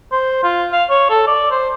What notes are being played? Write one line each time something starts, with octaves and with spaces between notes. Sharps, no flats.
C5
F4
F5
C#5
A4
D5
C5